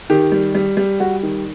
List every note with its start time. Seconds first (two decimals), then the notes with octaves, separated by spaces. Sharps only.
0.10 D#3 G4
0.32 G3
0.55 G3
0.77 G3
1.00 G3 F#4
1.23 D#3